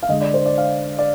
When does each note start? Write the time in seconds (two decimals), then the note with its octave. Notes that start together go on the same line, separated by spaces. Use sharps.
0.03 F5
0.08 D3 G#3 D#5
0.21 D5
0.34 C5
0.46 D5
0.58 F5
0.98 D5